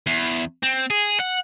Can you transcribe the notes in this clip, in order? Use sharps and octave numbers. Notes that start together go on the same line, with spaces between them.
E2
C4
G#4
F#5